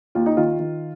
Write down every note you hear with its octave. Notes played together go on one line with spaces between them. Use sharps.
D#2 F4
D#4
D#3 F4
D#3